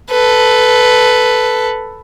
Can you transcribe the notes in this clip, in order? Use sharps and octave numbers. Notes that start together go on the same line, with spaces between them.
A4 B4